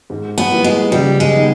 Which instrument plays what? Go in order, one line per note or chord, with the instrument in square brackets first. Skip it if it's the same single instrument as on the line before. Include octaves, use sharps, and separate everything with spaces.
[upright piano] G#2
[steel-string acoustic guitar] B3
[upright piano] G3 A#3 E4
[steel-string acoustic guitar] G#3
[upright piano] C#3 [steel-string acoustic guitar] G3
[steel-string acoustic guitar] G#3
[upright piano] G3 B3 D#4